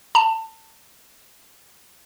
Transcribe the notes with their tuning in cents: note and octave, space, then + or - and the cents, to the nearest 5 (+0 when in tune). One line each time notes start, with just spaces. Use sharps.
A5 +25